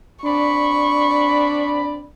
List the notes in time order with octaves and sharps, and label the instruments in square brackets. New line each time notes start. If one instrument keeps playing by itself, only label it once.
[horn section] C4 D5 B5 [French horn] D4 [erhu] C#6